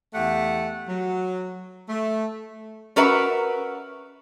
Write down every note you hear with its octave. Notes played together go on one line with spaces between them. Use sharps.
E2 A3 G4 F#5
F#3
A3
C#4 F#4 A#4 B4 E5